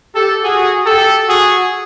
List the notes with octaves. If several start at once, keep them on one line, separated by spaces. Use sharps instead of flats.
G4 A4
F#4 G#4
G4 A4
F#4 G#4